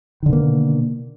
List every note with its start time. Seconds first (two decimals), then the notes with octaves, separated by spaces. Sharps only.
0.23 D#3
0.26 D3
0.29 B2
0.33 A#3